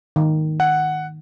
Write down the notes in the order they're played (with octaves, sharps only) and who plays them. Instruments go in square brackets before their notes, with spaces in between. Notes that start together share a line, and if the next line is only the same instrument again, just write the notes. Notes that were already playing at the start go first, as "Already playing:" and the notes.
[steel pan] D#3
[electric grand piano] F#5